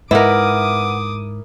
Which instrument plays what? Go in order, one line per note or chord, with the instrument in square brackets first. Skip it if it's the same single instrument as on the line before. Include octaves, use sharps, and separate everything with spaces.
[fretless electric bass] G#2 [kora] E4 A#4 [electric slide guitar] B4 E5 F#5 [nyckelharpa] D6 D#6